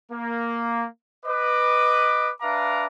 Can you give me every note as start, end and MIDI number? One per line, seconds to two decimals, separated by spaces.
0.12 0.86 58
1.26 2.31 71
1.26 2.31 75
1.26 2.31 86
2.42 2.87 62
2.42 2.87 71
2.42 2.87 76
2.42 2.87 77
2.42 2.87 82
2.42 2.87 86